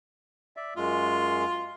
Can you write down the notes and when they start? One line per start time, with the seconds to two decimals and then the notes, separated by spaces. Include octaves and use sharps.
0.56 D5 E5
0.77 F#2 G#3 F4